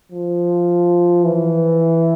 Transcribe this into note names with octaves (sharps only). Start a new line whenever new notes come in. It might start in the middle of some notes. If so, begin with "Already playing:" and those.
F3
E3